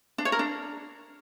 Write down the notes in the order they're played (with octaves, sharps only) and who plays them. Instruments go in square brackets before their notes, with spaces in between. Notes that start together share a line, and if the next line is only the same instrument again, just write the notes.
[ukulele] D4
C#5
A#4
D4